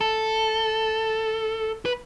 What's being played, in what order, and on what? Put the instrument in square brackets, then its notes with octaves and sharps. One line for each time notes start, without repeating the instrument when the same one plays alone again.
[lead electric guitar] A4
B4